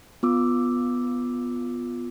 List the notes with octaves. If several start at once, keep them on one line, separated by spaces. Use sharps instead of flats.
B3 F4 D6 E6